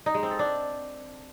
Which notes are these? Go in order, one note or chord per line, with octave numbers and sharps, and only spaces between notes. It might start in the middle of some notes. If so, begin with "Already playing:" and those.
D#4
G#3
C4
A4
D4